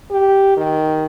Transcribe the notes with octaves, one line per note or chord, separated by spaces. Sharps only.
G4
D#3